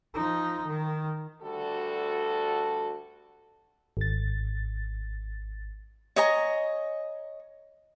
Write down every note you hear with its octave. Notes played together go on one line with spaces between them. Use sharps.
F3 D#4
D#3
D2 G3 F#4 A4
G#1 A6
C#5 D#5 G#5 A#5